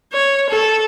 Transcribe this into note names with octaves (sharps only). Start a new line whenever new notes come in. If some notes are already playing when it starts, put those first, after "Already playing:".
C#5
A4